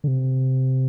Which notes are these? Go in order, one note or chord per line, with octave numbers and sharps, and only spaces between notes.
D3
C3